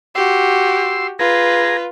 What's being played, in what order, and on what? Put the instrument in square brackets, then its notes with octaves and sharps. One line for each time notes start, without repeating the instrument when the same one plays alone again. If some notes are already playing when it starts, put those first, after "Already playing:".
[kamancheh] F#4 G4 [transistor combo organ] C6 E6
[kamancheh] F4 B4 [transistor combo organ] G#4 A#5